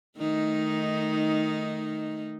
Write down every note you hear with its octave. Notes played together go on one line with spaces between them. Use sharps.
D#3 A3 D#4